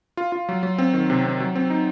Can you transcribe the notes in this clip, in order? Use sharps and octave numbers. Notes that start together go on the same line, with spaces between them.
F4
F4
F#3
F#3
C4
D#3
C3
C4
F#3
C4
D#4